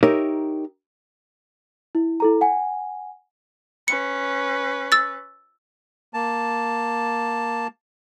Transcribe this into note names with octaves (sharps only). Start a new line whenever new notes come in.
D#4 G4 A#4 C#5 E5
E4
E4 A4 A#5
F#5 G#5
C#4 B4 C#7
E6 A6
A#3 A5